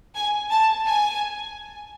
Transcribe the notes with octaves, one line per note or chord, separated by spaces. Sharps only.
G#5
A5
G#5